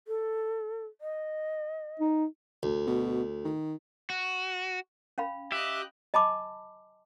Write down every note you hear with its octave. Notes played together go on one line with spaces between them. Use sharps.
A4
D#5
D#4
D2
B2
D#3
F#4
C#4 F5 B5
G4 D#5 E5 F#6
D#5 G#5 A5 B5 D6